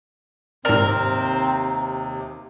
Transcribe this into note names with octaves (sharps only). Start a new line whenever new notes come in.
D#2 G#2 C3 C4 A#4 D5